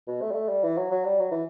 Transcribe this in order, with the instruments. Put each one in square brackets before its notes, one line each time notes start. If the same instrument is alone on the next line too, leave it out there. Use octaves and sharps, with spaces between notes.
[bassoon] B2
A3
G3
A3
G3
E3
F#3
F#3
G3
F#3
E3